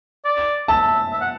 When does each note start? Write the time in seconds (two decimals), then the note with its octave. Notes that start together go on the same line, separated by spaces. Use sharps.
0.25 D5
0.68 E5 A5
1.12 E5
1.21 F#5